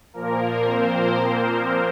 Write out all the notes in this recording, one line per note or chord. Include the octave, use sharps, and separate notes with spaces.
A#2 F3 A#3 A#4
C4 C5